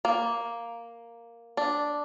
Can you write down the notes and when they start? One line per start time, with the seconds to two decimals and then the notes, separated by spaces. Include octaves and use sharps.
0.05 A#3
1.57 D4